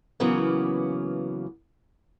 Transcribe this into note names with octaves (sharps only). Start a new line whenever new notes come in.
C#3 E3 F#3 A#3 B3 C#4